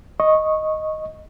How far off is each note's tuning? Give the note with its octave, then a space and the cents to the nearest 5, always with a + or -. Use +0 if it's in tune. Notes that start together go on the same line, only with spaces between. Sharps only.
D#5 +0 C#6 -15